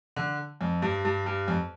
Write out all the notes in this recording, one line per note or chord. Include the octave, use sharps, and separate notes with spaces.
D3
F2
G2
G2
G2
F2